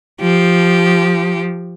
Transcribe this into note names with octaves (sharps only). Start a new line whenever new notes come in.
F3 G4